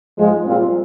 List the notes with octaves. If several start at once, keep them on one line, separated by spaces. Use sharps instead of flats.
G#2 F3 G#3
A#2 G3 C4 F4